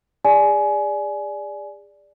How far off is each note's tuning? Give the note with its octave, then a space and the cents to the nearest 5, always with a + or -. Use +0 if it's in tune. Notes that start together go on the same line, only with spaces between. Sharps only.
G#4 -35 D5 +0 G#5 +20